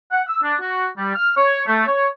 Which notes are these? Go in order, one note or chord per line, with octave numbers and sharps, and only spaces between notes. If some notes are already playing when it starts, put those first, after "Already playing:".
F#5
E6
D4
F#4
G3
F6
C#5
A3
C#5